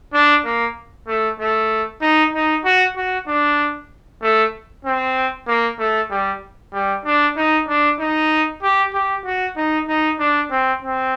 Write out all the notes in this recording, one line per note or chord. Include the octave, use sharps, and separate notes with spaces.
D4
A#3
A3
A3
D#4
D#4
F#4
F#4
D4
A3
C4
A#3
A3
G3
G3
D4
D#4
D4
D#4
G4
G4
F#4
D#4
D#4
D4
C4
C4